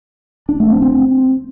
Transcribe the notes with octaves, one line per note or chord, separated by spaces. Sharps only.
D4
A3
C4
C4